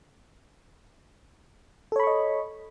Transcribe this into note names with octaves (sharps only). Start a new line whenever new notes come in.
A4 C#5 D#5 B5 C#6